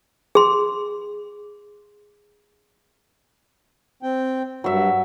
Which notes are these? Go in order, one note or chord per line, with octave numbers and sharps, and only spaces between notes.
G#4 C6
C4 G5
G2 F#3 E5